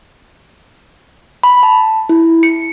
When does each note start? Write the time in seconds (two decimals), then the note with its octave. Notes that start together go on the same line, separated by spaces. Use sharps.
1.44 B5
1.63 A5
2.09 E4
2.43 C#7